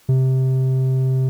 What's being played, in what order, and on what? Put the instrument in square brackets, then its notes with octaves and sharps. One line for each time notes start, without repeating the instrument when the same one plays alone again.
[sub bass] C3